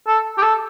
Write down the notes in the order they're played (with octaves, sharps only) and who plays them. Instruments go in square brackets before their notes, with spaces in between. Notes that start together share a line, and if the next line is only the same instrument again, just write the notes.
[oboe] A4
G4
A4